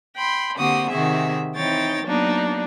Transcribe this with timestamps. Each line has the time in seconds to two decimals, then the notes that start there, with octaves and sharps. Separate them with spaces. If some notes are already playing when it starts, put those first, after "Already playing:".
0.15 G5 B5 C6
0.57 D3 A#3 C4 F#4 G4 D#6
0.89 C3 D#3 F#4 G#4 E5
1.55 E3 C4 D#4 C#5 G5 A6
2.04 F#3 A#3 B3 D4 D#4